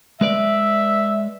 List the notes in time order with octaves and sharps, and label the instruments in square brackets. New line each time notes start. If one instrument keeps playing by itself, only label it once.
[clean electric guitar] G#3 B4 D5 [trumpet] E5